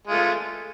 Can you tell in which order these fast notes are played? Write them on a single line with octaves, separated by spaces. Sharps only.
G#3 F4 A3